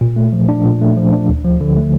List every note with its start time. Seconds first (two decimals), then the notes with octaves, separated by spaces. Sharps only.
0.01 A#2
0.16 A3
0.33 F3
0.49 D4
0.65 A#2
0.81 A3
0.96 F3
1.13 D4
1.29 D2
1.44 F3
1.61 D3
1.77 A3